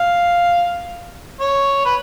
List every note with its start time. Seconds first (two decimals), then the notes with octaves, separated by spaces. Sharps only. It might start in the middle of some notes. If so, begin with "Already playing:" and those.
Already playing: F5
1.40 C#5
1.85 B4